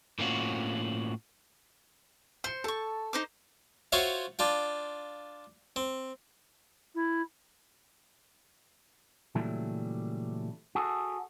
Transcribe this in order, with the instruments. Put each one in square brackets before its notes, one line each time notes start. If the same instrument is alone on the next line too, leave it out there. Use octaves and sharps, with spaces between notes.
[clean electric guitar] A2 A#3 C4 C#4 F4 F#4
[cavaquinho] C5 [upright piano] G6 C#7
[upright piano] A4 [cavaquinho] A5 C#6
[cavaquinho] D#4 C5 D6
[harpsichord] F4 F#4 C5 C#5 E5 F5
D4 F4 G5
C4
[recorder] E4
[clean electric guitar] A#2 C#3 E3 F#3 G3 A3
F#4 G#4 A4